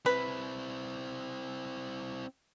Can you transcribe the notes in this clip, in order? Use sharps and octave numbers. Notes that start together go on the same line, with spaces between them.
C4 E4 B4